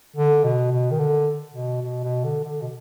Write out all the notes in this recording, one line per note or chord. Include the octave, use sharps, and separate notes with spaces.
D3
B2
B2
D#3
D3
B2
B2
B2
D3
D3
B2